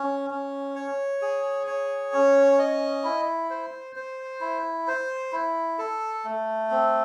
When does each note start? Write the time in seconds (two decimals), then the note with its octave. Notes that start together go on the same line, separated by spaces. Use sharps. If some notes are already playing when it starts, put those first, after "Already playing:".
Already playing: C#4
0.30 C#4
0.75 C#5
1.22 G#4
1.67 C#5
2.13 C#4
2.59 D#5
3.04 E4
3.50 C5
3.96 C5
4.41 E4
4.88 C5
5.32 E4
5.78 A4
6.24 A3
6.70 C4